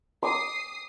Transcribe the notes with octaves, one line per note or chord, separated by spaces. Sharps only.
D6 D#6 C7